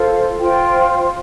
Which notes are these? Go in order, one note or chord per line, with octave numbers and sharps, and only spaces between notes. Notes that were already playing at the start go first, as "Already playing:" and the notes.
Already playing: F4 A4 C5
F4 C5 G5